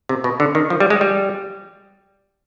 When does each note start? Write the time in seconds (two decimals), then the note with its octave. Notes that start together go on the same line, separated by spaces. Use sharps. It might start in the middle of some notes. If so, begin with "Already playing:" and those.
0.09 C3
0.24 B2
0.40 D3
0.55 D#3
0.70 F3
0.80 G3
0.90 G#3
1.01 G3